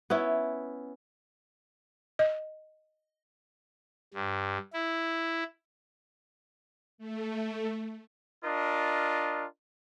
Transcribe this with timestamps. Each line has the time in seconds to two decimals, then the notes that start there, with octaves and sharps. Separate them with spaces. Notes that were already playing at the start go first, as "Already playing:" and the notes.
0.10 B3 C#4 E4
2.19 D#5
4.14 G2
4.73 E4
6.98 A3
8.45 D4 F4 A#4 D#5